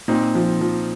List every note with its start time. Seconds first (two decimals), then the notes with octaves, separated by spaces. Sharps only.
0.08 A#2 C4 D#4
0.35 F3
0.61 F3